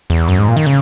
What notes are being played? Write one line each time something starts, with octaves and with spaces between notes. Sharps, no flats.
E2
F#2
G#2
A#2
D#3
C#3